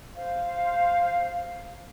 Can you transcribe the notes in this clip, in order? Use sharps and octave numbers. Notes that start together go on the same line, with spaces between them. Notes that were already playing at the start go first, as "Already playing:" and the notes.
C5 F5